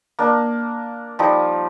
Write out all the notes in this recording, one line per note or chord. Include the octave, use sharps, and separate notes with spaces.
A#3 D4
F3 G3 D#4